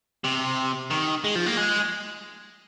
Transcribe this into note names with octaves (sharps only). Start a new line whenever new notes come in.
C3
D#3
G#3
F3
A#3
G#3